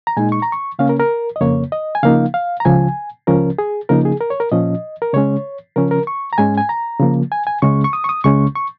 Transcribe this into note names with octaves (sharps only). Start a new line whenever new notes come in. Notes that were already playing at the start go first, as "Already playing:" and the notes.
A#5
A#2 G#3 D#4 G#5
C#6
A#5
C#6
C#3 A#3 C#4 F5
A#4
A#4
D#5
F2 C#3 A#3 C#5
D#5
G#5
C#3 F3 A#3 D#4 F5
F5
A#5
C#2 C#3 F3 G#5
C#2 C#3 F3 C#4 A#4
G#4
C#3 F3 A#3 D#4 A#4
G#4
A#4
C#5
A#4
A#2 F3 C#4 D#5
A#4
C#3 G#3 C#4 C#5
C#3 F3 C#4 A#4
A#4
C#6
A#5
G#2 G#3 C#4 G#5
G#5
A#5
C#3 F3 A#3
G#5
G#5
C#2 C#3 G#3 C#4 C#6
C#6
D#6
C#6
D#6
C#2 C#3 G#3 C#4 C#6
C#6